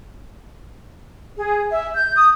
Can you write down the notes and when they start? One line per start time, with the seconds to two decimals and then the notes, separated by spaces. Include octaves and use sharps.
1.37 G#4
1.70 E5
1.94 G6
2.16 D#6